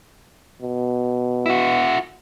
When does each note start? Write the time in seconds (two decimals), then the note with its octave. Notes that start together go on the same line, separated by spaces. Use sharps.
0.62 B2
1.46 E4 F#4